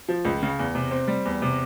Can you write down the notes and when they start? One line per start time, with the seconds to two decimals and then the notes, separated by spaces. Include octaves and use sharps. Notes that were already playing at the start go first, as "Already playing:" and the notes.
0.08 F3
0.25 C#2
0.42 C#3
0.59 E2
0.75 C3
0.91 C4
1.08 G3
1.25 E2
1.42 C3